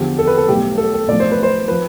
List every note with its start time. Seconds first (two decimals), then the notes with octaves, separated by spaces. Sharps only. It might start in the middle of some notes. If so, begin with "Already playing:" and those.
Already playing: E2 D3 F3 G4
0.19 A4
0.27 B4
0.37 A4
0.48 B1 A2 G3 G4
0.77 A4
0.93 A4
1.08 B1 A2 F3 D5
1.20 C5
1.32 B4
1.43 C5
1.68 F3 B4